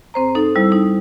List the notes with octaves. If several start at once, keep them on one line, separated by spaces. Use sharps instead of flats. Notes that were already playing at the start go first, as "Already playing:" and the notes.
G#2 C4 C5 A#5
D#4 A4
G3 E4 C5 E6
D#4